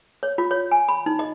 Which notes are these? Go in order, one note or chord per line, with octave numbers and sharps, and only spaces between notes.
C#5
F4
C#5
G#5
B5
D#4
D#5